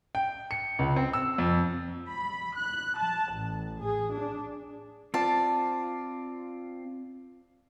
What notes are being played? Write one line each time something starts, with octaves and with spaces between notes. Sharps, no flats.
G5
C#7
C#2
C4
E6
F2
B5
F#6
A5
A1
G#4
D4
C4 F4 D5 A5